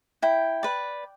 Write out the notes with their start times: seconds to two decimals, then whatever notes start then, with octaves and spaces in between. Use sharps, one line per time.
0.22 E4 G5
0.63 B4 D5